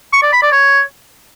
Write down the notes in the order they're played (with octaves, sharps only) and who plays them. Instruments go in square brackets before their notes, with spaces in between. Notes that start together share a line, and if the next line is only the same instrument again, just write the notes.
[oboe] C#6
D5
B5
D5
C#5